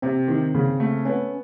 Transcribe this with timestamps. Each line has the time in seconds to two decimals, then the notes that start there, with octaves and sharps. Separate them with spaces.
0.02 C3 C4
0.28 D#3
0.54 C#3
0.80 A3
1.05 B3 C#4